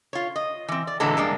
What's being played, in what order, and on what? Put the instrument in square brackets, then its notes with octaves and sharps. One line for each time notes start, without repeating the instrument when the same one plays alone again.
[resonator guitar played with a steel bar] F4 C#5
D#5
E3 C4
D5
A#2 D3 E3 F#3 G#3 A4
G2 G#3 A#3 D4